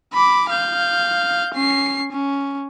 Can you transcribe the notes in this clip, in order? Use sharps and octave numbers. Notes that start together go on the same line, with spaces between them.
B5 D6
F5 G6
C#4 C7
C#4